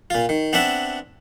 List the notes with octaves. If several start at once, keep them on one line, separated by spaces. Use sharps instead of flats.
A#2 F4
D#3
B3 C4 D4 E5 F#5